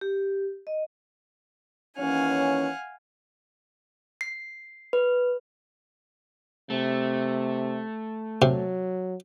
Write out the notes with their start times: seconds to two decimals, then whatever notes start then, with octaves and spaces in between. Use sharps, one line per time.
0.01 G4
0.67 D#5
1.98 D#2 E3 C#4 F5 F#5 G#5
4.21 C7
4.93 B4
6.70 C3 A3
8.42 C3 F#3